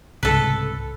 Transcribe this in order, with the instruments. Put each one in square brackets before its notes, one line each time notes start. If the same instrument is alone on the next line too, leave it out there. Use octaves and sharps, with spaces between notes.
[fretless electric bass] C2 G#2 C#3 [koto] A4 B4